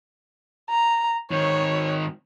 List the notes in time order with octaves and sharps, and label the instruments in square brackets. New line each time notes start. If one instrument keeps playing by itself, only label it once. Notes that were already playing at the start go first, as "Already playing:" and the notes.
[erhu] A#5
[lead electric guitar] G#2 D#3 [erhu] C#5